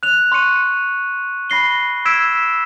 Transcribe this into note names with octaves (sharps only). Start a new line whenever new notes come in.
F#6 F7
C6 C#6 F#6 C#7 D#7
B5 A#6 C7 G7
E6 G#6 B6 D7 E7